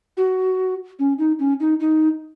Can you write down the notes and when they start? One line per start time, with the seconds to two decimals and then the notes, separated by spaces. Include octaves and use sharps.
0.17 F#4
0.99 C#4
1.19 D#4
1.39 C#4
1.60 D#4
1.80 D#4